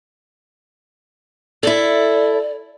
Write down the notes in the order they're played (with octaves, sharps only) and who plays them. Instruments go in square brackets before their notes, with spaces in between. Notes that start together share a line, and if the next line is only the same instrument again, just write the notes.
[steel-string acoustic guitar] E4 A4 [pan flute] D5